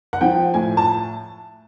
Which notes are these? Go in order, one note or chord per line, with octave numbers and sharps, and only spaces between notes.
F#5
F3 G5
A2 G#5
A5